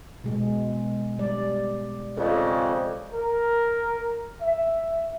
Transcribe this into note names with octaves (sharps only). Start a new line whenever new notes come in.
B2 G#3
G3 D5
F2 C#3 D5 D#5
A#4
E5